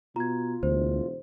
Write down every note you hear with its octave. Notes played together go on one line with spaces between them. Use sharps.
B2 F4 A#5 G#6
E1 D2 C5